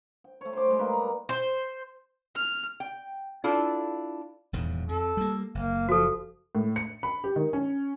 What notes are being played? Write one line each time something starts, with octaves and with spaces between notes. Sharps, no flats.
G5
A3 C#5
C5 C6 D6
G3 G#3
A#3 D#4 B4
A#5
C5
F6
G5
D4 E4 F4 A4
D#1 E2 G#2
F2 A4
G3 A#3
F#1 A#3
F3 F#4 A4
A2
C#7
B5
G4
D#3
C#4